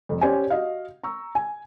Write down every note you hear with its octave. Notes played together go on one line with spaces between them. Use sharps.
F1 F2
C#4 G4 C5 D5 G#5
F#4 D#5 F5
A#5 C#6 E6
G#5